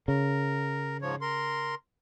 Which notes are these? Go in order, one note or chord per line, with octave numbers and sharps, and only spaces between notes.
C#3 A#4
G#2 F3 C#5
A#4 C6